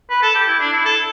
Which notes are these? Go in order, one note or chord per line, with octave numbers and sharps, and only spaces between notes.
B4
A4
G4
E4
D4
E4
A4